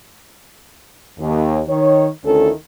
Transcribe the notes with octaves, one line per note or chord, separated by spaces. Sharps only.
D#2
D#3 C#5
D2 D#3 C#4 E4 A4